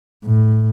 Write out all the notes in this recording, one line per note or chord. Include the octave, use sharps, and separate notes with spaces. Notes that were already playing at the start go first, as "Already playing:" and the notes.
A2